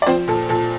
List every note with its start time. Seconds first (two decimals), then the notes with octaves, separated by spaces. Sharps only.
0.02 D5
0.06 F3 C4 C5
0.28 A#2 A4
0.49 A#2 A4